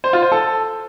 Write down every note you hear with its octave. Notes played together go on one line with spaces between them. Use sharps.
C5
F4
C5
A4